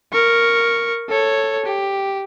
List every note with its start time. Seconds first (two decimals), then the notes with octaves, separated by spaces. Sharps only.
0.13 A#4 C#6
1.09 A4 C#5
1.65 G4